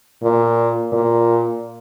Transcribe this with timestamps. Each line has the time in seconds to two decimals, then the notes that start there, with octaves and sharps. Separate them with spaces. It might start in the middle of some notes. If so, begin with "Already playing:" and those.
0.23 A#2
0.92 A#2